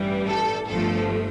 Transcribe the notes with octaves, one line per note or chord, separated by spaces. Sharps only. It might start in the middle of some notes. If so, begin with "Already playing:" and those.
Already playing: A1 G2 E3 G3
A4
G1 G2 F3 A3 A4